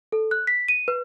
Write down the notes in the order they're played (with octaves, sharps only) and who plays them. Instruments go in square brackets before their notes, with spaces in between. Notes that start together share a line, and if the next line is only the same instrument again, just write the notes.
[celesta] A4
F#6
B6
D#7
B4